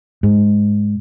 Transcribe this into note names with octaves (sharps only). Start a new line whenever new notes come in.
G#2